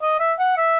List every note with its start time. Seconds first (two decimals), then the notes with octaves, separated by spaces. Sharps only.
0.02 D#5
0.20 E5
0.39 F#5
0.57 E5